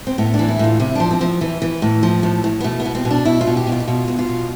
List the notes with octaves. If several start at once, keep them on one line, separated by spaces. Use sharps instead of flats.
C4
A2 B3
D4
E3
E4
A2 F4
C3 E4
F3 D4
C4
F3
E3
E3
A2
F3
A2
A2
B3
B2 A3
B3
B2
C4
B2
D4
B2 E4
F4
B2
G4
B2
F4
G4
B2 F4
B2
F4
B2